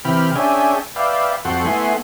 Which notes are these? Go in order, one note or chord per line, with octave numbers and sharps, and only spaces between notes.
C3 E3 G5 B5 F6
C#4 D4 G#4 E5 G5 G#5
B4 D5 E5 F5 G5
F2 F#4 A4 F#5 G5 C6
A3 B3 E4 F#5 G#5 C6